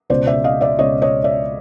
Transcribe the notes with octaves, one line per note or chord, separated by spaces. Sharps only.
C#2 B2 G#3 C5 D5
D5 E5
D#5 F5
D5 E5
C#2 B2 G#3 C#5 D#5
C#5 D#5
D5 E5